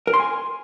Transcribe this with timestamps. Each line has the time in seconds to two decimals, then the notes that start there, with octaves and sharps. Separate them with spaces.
0.07 A#4
0.14 C6
0.20 G#5